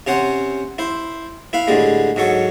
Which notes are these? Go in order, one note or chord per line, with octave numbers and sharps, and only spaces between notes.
C3 C#4 C5 F#5
E4 C5
E4 B4 F5
A2 D3 G3 G#3
G#2 F#3 A4 C#5